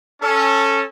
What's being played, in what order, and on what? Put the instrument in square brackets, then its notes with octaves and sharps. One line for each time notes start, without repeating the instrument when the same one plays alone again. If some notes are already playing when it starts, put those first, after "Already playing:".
[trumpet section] C#4 A4